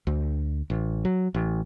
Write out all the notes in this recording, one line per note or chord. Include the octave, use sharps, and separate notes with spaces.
D2
A1
F#3
A1